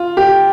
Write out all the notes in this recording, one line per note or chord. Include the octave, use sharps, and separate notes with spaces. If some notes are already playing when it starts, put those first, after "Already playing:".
Already playing: F4
G4